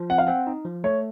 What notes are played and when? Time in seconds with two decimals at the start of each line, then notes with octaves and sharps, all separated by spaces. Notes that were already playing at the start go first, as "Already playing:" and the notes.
Already playing: F3
0.10 C4 F#5
0.18 F5
0.27 C4 F#5
0.47 D#4
0.65 F3
0.84 A3 C#5